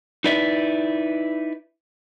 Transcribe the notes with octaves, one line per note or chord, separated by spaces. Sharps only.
D#4 E4 B4 D5 E5